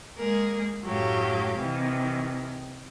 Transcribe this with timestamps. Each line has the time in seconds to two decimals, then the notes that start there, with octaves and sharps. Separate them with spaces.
0.18 G#3 A#3 G#4 A#4
0.83 F#2 A2 F#3 G4 F5
1.59 C3 D#3 E3